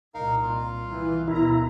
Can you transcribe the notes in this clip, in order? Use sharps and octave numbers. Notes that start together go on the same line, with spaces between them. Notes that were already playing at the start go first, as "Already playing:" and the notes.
C2 A#2 D#4 A#4 F5
F4 F5
E3
D2 B2 E4 A#4 A#5